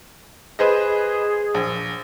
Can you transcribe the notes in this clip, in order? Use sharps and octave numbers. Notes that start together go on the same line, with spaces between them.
G#4 B4 C5 D#5
A#1